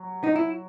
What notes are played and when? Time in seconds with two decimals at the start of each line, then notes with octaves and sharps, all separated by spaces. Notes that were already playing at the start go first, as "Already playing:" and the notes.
Already playing: F#3
0.24 D#4
0.36 E4